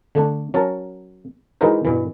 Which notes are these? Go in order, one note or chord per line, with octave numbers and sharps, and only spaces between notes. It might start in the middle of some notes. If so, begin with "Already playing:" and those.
D3 A3 D4
F#3 C#4 A#4 A5
E3 G#3 D#4 F#4 A#4 C5
G2 B2 E3